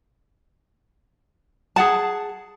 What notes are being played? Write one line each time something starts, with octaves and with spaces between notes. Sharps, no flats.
G#4 F#5 A5